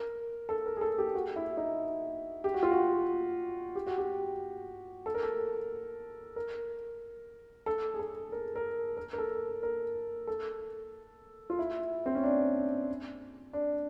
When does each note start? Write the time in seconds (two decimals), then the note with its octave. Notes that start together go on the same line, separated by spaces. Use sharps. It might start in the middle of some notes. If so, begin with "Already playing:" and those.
Already playing: A#4
0.49 A4
0.66 A#4
0.77 G#4
0.81 A4
0.98 G4
1.15 F#4
1.36 E4
1.57 D#4
2.44 G4
2.54 F#4
2.63 F4
2.71 F#4
3.75 G4
3.87 F#4
3.98 G4
5.06 A4
5.14 A#4
5.23 A4
6.36 A#4
7.66 A4
7.94 G#4
7.99 A4
8.32 A#4
8.56 A#4
8.97 A#4
9.13 A#4
9.18 A4
9.63 A#4
10.27 A4
11.50 F4
11.59 E4
12.06 C4
12.15 C#4
12.24 D4
13.53 D4